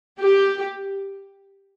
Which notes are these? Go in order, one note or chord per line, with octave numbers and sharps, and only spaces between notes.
G4